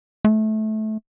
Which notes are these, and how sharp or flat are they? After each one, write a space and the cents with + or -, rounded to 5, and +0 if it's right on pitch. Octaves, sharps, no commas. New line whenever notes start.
A3 -20